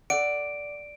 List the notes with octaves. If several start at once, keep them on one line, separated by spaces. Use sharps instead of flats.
A4 D5 F#5 D7